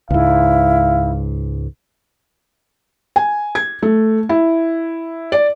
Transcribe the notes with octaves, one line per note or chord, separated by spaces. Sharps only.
C#2 G#2 E4 F5
G#5
G#6
A3
E4
D5